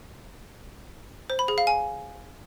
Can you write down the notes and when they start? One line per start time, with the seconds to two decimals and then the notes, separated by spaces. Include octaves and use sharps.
1.30 C5
1.39 B5
1.48 G#4
1.58 F5
1.67 G#5